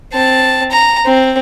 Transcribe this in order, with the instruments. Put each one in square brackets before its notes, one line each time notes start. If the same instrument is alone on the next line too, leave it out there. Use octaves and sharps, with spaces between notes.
[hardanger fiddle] C4 A5
A#5
C4